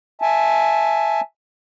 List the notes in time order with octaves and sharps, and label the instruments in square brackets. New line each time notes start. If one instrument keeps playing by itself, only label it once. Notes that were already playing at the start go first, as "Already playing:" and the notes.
[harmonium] E5 G#5 A5